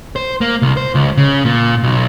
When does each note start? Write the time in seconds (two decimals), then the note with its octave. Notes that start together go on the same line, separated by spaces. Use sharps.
0.16 C5
0.41 A#3
0.62 C2
0.77 C5
0.95 C#2
1.17 C#3
1.45 A#2
1.83 B1